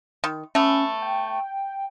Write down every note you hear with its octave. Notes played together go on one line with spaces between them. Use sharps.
D#3
A3 B3 C#4
G5